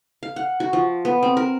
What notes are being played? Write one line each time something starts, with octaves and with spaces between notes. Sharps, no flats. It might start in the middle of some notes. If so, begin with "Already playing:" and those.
F5
F#5
F#4
F3
B3
C4
A#4